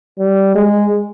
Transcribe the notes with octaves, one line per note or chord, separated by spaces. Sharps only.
G3
G#3